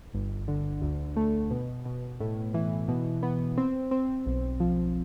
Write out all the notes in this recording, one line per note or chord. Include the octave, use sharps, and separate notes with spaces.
G1
D3
D2
A3
B2
B2
A2
E3
B2
B3
C4
C4
B1
F3